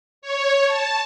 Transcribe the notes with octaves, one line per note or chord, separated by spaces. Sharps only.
C#5
A5